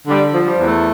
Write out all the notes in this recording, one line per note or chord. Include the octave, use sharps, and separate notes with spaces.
D3 G3
F3
G3
E2
A3